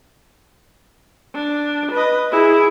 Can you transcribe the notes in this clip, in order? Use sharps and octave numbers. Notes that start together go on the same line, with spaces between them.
D4
B4 D#5
E4 G#4